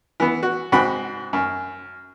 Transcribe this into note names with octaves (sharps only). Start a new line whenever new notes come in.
E3 B3
F#4
G#2 C4 F#4 B5
F#2